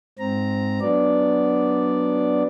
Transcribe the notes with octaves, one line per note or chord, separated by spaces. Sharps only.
G#2 C4 A#5
F#3 B3 D4 D5